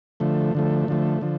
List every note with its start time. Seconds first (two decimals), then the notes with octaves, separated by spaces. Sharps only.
0.20 D3 F3 A3
0.55 D3 F3 A3
0.88 D3 F3 A3
1.21 D3 F3